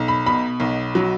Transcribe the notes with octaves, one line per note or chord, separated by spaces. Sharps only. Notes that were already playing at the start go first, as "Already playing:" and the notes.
Already playing: B1
B5
B2 B5
B1
F#3